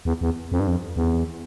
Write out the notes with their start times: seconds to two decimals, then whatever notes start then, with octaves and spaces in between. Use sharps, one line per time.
0.05 E2
0.21 E2
0.52 F2
0.60 G2
0.67 F2
0.96 E2